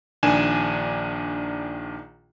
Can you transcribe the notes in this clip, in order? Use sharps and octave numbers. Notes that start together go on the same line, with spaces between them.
A#1 D#3 D4 G#5 E7